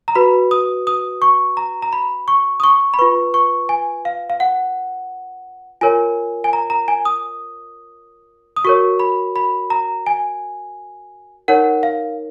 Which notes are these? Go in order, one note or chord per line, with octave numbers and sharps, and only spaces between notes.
A#5
F#4 B4 B5
D#6
D#6
C#6
A#5
A#5
B5
C#6
D#6
C#6
B5
F4 B4 C#6
C#6
G#5
F5
F5
F#5
F4 A#4 C#5 G#5
G#5
A#5
A#5
G#5
D#6
D#6
F#4 A#4 C#5 C#6
B5
B5
A#5
G#5
D#4 A#4 C#5 F#5
F5